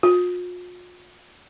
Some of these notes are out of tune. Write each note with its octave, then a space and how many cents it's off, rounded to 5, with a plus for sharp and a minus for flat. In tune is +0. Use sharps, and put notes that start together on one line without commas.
F4 +40